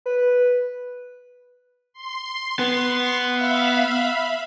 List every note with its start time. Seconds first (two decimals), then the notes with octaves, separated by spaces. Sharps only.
0.05 B4
1.93 C6
2.59 B3
3.33 E5 F5 B5